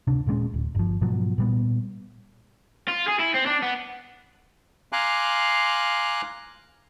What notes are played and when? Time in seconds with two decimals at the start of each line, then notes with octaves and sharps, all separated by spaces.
0.07 D1 C3 D4
0.27 D#1 A#2 G#3 C#4
0.54 D1
0.75 G1 F3
1.01 G#2 B2 F3 F#3
1.38 A#2 G3 B3
2.88 F4
3.08 G#4
3.20 E4
3.35 C4
3.47 D4
3.63 B3
4.92 F5 G#5 A#5 C6 D6 F#6